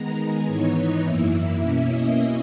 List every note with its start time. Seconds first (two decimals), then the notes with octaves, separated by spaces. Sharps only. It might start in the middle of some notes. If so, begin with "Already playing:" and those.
Already playing: D#3 G#3 B3 A#5
0.18 G#5
0.46 G#2 E3 B3 D#4 C#5
0.75 D#5
1.03 F#2 E3 A#3 E4 E5
1.60 B2 A#3 C#4 E4
1.87 D#5